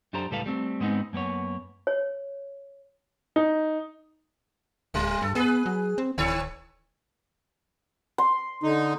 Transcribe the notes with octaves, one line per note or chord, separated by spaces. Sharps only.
F#2 D4 G4 A4 C5 A#5
C#2 A2 G3 A4 B4 F5
G3 A3 C4
G#2 G#3 B3 C4 D#4
F#2 A#3 B3 C#5
C#5
D#4
D1 G3 A3
G2 A4
B3 G#4 B4
F#3
C4
D1 D#3 A4 C#5
C6
D3 D#4